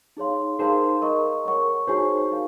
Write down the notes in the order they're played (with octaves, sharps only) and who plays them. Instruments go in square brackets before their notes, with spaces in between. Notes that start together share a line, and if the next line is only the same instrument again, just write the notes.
[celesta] D#4 G#4 C#5 F5 C6
[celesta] D#4 A#4 F5 C6 [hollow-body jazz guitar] G#4 C5
[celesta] A#4 D#5 A#5 C#6
A#4 C#5 F#5 C#6
[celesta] D#4 F#4 C#5 G#5 C#6 [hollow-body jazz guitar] G#4 C5
[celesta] D#4 A#4 F5